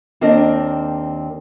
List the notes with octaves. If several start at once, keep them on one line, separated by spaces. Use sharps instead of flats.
D#2 C4 D4 A#4 D#5